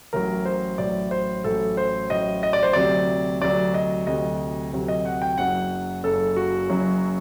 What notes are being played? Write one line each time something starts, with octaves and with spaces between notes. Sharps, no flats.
A1 A2 F#3 A#4
C5
A1 A2 F#3 D5
C5
A1 A2 F#3 A4
C5
A1 A2 F#3 D#5
D#5
D5
C5
D2 C3 F#3 D5
D2 C3 F#3 D5
D#5
D2 C3 F#3 D#5
D2 C3 F#3
D#5
F#5
G5
F#1 F#2 F#3 F#5
F#1 F#2 F#3 A4
F#4
F#1 F#2 F#3